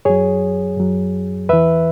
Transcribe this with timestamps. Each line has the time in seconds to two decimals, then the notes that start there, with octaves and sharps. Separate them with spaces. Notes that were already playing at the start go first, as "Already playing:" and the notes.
0.05 F#2 F#3 G#4 C#5
0.77 F#2 F#3
1.49 E2 E3 B4 E5